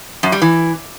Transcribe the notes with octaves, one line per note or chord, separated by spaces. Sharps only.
F#2
G3
E3